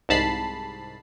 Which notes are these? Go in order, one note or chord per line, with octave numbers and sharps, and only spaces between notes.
C2 G#2 A5 B5 C7